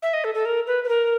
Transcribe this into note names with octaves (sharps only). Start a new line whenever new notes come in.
E5
D#5
A4
A4
A#4
B4
B4
A#4